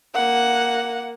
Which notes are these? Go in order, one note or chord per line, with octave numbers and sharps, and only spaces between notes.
A#3 F#5